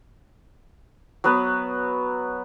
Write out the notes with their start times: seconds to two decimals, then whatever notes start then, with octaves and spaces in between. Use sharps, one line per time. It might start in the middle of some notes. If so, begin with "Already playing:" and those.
1.24 F#3 B3 B4